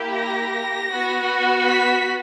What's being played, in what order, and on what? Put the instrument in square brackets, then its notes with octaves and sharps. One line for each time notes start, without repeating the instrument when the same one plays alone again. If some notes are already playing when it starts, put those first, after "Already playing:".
Already playing: [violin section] A#3 E4 G4
A#6
B3 F#4
B6